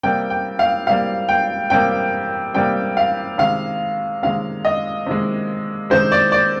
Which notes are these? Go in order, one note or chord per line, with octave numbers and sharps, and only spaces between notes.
C3 G3 A#3 G5
G5
F5
C3 G3 A#3 F5
G5
C3 G3 A#3 G5
C3 G3 A#3 G5
F5
C3 D#3 G#3 F5
C3 D#3 G#3 F5
D#5
C3 D#3 G#3
C3 D#3 G#3 C5
D5
D5